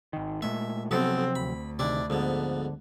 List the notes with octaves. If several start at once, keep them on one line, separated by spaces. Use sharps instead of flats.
G#1 D#3
A#2 G#3 A3 E5
B1 C3 F3 F#3 B3 C4 A4
D2 B5
C3 D#3 D4 E4 D5
F2 G#2 D3 B3